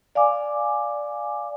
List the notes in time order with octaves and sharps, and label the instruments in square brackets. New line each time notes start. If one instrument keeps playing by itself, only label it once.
[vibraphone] D5 F5 G#5 D6